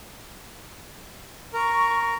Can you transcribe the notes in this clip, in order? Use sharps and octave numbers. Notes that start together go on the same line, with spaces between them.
A#4 C#6